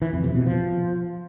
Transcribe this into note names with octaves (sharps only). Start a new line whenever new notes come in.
E3
F2
C3
B2
F3